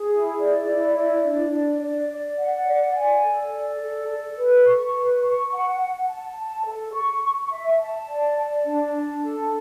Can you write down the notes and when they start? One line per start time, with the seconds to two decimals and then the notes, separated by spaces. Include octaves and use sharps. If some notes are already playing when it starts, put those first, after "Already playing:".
Already playing: G#4
0.11 E4
0.39 D5
0.67 E4
0.96 D5
1.24 D4
1.53 D5
1.82 D5
2.10 D5
2.39 F#5
2.67 D5
2.96 G#5
3.23 A4
3.53 D5
3.81 A4
4.09 A4
4.37 B4
4.66 C#6
4.94 B4
5.22 C#6
5.52 F#5
5.80 F#5
6.08 A5
6.37 A5
6.65 A4
6.94 C#6
7.23 C#6
7.51 E5
7.79 A5
8.08 D5
8.36 A5
8.64 D4
8.93 A5
9.21 A4